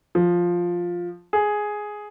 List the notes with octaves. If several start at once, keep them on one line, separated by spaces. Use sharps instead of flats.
F3
G#4